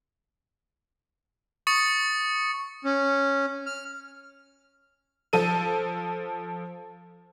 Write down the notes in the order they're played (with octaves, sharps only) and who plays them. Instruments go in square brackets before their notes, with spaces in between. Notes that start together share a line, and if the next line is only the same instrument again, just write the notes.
[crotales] C#6 D#6 A6 C#7
[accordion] C#4
F6
[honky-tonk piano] F3 A4 D#7